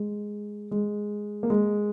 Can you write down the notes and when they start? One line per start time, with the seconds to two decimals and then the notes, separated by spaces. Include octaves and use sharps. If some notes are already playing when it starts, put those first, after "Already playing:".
Already playing: G#3
0.71 G#3
1.43 A#3
1.50 G#3